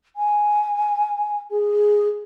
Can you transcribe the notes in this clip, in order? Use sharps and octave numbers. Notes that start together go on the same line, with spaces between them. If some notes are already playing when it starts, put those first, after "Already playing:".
G#5
G#4